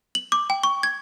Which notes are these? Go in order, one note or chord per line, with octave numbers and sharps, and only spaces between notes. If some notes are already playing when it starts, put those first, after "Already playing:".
F#7
D6
G5
C#6
G#6